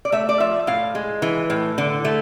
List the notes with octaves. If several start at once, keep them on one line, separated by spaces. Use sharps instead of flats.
D5
A3 E5
D5
F3 E5
A2 F5
G#3
E3
A2
D3
A3